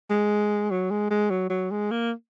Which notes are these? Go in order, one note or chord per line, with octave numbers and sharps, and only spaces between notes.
G#3
F#3
G#3
G#3
F#3
F#3
G#3
A#3